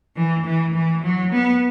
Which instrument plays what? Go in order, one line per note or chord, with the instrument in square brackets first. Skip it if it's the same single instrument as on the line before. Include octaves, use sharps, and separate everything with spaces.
[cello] E3
E3
E3
F#3
B3